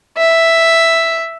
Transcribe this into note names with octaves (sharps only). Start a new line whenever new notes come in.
E5